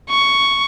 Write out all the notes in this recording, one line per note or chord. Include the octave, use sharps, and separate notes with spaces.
C#6